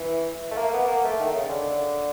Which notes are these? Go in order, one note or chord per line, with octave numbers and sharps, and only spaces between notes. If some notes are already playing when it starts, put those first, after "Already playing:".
Already playing: E3
A3
A#3
B3
A#3
A3
D#3
C#3
D3